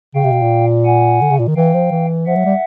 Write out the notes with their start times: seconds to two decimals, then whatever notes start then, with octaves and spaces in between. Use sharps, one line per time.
0.15 C#3 F5 G5
0.24 C3
0.32 B2
0.42 A#2
0.86 F#5 G#5
1.21 D3
1.30 C#3
1.39 A#2
1.47 D#3
1.56 E3 F5 G5
1.74 F3
1.91 E3
2.27 F3 E5 F#5
2.36 F#3
2.45 G3